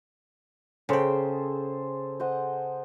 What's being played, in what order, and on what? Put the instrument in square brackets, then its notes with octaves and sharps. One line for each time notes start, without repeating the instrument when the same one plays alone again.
[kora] C#3 G5 [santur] G#4 A4 C5
[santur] C5 D#5 F#5